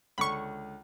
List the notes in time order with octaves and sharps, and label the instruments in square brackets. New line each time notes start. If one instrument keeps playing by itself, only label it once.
[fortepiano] C#2 D3 [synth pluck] B5 C#6